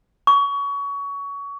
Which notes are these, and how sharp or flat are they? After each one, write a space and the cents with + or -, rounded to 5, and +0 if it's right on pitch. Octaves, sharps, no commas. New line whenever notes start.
C#6 +25